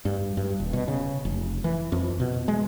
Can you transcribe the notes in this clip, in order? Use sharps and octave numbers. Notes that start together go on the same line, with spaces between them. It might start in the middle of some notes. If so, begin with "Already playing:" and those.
G2
G2
D#1
B2
C#3
F1
E3
F2
B2
G#3